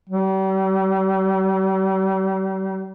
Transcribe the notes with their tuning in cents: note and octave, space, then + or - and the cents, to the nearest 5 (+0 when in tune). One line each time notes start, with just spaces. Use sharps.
G3 -40